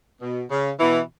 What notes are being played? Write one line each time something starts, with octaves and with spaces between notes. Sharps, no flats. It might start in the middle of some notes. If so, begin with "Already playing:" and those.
B2
C#3
B2 E3